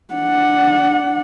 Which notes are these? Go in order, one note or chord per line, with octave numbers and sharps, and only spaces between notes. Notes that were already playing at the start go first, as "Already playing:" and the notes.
D4 F#5